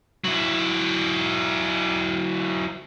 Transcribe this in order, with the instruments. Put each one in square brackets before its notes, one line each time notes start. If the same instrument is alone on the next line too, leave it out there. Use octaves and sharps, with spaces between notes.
[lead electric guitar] F#3 E4